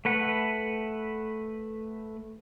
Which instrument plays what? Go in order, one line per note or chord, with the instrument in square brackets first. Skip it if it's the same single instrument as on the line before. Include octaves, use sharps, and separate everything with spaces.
[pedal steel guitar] A3 B4 F#5